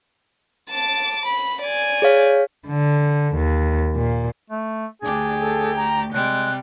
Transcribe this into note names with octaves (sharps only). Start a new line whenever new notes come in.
A5 D6
B5
D5 G#5
G#4 C#5 F5
D3
D#2
A#2
A3
D2 D4 G4 G#4
A4
A#5
C3 G3 G#3 F#6